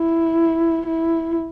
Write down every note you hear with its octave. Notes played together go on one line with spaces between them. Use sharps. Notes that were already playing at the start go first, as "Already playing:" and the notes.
Already playing: E4
E4